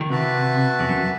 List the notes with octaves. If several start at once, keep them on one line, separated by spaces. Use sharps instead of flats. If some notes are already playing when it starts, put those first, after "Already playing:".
D#3
C3 F#4 B4 E5 A5
E2
F#2